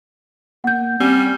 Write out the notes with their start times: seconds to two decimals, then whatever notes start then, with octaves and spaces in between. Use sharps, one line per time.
0.64 A#3 F#5 G6
1.00 G3 C4 C#4